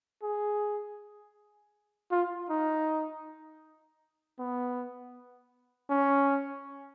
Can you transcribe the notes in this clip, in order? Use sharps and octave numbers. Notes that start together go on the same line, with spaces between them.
G#4
F4
D#4
B3
C#4